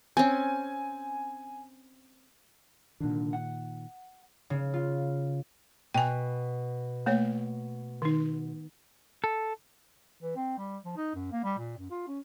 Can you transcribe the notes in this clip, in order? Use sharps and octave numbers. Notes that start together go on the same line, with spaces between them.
C4 C#4 G#5
C2 A#2 D3 D#3 D4
F#5
C#3
F4
B2 G5 G#5
A3 A#3 C#5
D#3 D#4
A4
E3
C4
G3
F3
D#4
F#2
A#3
G3
A#2
F#2
F4
C#4